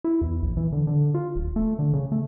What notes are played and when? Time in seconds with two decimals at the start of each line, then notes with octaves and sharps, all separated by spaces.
0.04 E4
0.21 E2
0.42 A#1
0.57 E3
0.72 D3
0.87 D3
1.14 F4
1.35 D1
1.56 A3
1.79 D3
1.93 C#3
2.12 A3